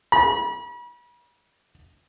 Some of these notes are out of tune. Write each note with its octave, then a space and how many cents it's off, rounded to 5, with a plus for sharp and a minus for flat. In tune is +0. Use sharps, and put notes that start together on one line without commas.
B5 -40